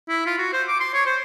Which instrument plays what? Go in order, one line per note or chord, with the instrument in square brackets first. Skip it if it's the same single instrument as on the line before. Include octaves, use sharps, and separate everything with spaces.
[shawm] E4
F4
F#4
C5
D6
C6
C#5
C5